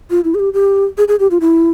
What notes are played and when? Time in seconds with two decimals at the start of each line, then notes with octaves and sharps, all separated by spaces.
0.10 F4
0.24 E4
0.35 G#4
0.39 G4
0.53 G4
0.98 G#4
1.08 G#4
1.20 G4
1.31 F4
1.41 E4